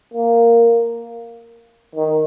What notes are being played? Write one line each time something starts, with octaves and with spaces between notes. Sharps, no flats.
A#3
D#3